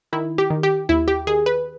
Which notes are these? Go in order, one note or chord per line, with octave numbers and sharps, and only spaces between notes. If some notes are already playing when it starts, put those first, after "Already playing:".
D#3 E4
G4
D#3
G4
D#2 E4
G4
D#3 G#4
B4